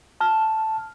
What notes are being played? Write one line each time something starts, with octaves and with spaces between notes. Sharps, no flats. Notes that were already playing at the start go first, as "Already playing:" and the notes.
A5 F6